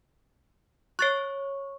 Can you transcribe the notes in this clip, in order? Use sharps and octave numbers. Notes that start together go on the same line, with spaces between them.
C#5 C#6 F#6 A6 C7